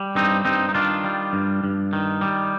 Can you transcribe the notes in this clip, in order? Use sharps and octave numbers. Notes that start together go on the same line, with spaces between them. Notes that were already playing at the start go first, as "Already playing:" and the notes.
Already playing: G3
G2 C4 D#4
G2 C4 D#4
D#4
D#3 D4 F4
G3
G2
G2
D#3
G3